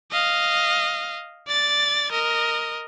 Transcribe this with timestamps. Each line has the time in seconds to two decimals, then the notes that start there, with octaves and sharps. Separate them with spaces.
0.12 D#5 F5
1.48 D5 A6
2.12 A#4 D#5